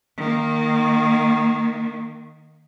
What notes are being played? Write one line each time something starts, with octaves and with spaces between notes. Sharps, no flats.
D#3 A#3